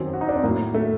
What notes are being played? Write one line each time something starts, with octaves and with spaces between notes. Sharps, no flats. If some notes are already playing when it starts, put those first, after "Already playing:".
Already playing: F#2 D#3 F#3 C4
F#4
D#4
D4
C4
A2 F#3 A#3
A3